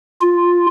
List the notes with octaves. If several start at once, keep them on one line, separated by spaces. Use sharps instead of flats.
F4